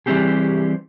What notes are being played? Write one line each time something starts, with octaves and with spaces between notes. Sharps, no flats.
E3 G3 B3 C4 G4 G#4